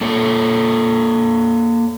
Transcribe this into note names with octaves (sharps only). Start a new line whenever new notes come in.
A#3 A4 C#5